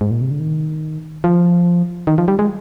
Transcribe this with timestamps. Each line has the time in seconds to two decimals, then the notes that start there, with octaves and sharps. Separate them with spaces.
0.01 G#2
0.11 A#2
0.21 C3
0.31 D3
0.40 D#3
1.24 F3
2.07 D#3
2.18 F3
2.28 G3
2.39 G#3